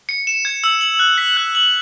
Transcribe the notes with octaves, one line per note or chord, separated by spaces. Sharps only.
C#7
E7
G#6
E6
F#7
F#6
B6
F#6
F#7